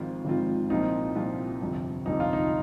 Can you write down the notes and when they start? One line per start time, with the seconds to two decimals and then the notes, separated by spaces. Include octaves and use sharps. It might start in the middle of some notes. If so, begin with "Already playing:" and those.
Already playing: G#1 G#2 F3 C4 F4
0.25 G#1 G#2 F3 C4 F4
0.70 C2 A#2 F3 C4 D#4 F4
1.15 C2 A#2 F3 C4 F4
1.61 G1 F2 C3
2.06 G1 F2 C3 D#4
2.20 F4
2.33 D#4